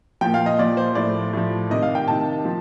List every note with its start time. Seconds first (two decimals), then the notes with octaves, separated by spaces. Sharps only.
0.21 A#2 F3 G5
0.34 F5
0.46 D#5
0.59 A#2 F3 D5
0.77 C5
0.95 A2 F3 D5
1.33 A2 F3
1.70 C3 D#3 D#5
1.82 F5
1.95 G5
2.08 C3 D#3 A5
2.45 F3